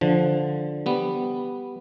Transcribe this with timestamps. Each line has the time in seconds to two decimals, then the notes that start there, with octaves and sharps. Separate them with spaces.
0.01 D3 F3
0.86 G3 B3